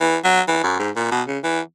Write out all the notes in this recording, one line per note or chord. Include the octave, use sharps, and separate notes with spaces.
E3
F#3
E3
F#2
G#2
A#2
B2
C#3
E3